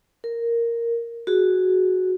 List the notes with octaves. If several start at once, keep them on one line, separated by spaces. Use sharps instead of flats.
A#4
F#4 G#4